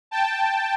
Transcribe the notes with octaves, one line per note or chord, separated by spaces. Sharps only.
G5 A5